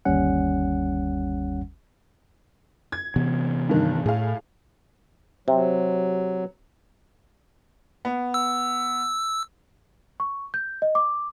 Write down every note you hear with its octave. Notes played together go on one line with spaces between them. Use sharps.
G1 D#2 G3 C#4 F#5
G#6
C3 E3 B3
G2 D#3
A2 G#4 F5
C3 F#3
B3
E6
C#6
G6
D#5
D6